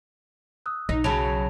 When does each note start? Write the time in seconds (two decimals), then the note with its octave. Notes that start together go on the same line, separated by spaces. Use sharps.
0.66 D#6 E6 F#6
0.89 B1 D#4
1.04 C#3 F#3 A5 B5 F7